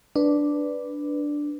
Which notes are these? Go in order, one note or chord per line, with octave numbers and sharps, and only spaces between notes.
D4 B4